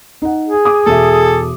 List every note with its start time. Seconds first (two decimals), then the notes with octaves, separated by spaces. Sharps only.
0.22 D#4 F#5
0.48 G#4
0.65 D6 D#6
0.86 E1 A4 E5